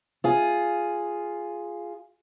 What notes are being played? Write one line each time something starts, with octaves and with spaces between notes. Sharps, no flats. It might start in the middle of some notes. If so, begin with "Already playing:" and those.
F4 G#4